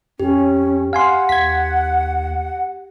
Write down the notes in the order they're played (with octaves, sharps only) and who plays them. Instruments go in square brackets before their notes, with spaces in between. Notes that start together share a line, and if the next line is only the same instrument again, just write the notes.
[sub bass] F2 [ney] C#4 [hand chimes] G4
[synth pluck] F5 G#5 C6 [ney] F#5
[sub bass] D#2 [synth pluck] G#6 B6